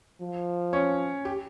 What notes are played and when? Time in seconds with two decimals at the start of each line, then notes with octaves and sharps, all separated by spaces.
0.21 F3
0.73 C#4 C#5
1.25 G4